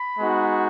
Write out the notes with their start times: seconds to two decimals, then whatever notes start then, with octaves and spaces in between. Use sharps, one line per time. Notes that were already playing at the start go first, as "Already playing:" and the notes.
Already playing: B5
0.18 G#3 B3 D#4 F#4